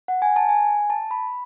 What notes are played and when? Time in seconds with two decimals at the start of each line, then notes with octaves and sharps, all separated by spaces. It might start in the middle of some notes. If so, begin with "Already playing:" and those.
0.08 F#5
0.22 G#5
0.36 A5
0.49 G#5
0.90 A5
1.11 B5